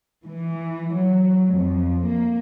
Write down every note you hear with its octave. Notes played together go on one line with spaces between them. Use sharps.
E3
F#3
F2
A#3